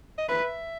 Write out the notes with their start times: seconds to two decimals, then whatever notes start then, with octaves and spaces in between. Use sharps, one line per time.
0.18 D#5
0.29 B4 E5